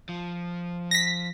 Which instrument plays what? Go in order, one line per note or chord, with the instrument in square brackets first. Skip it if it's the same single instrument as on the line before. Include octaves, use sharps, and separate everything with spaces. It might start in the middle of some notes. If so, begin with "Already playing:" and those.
[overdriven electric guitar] F3
[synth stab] A#6 B6